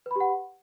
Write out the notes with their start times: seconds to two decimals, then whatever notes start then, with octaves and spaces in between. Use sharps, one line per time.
0.06 B4
0.11 B5
0.16 G4
0.20 F#5